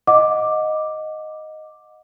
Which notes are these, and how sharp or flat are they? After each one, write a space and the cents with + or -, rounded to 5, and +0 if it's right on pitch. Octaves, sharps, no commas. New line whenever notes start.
D#5 +0 F#5 -30 D6 +0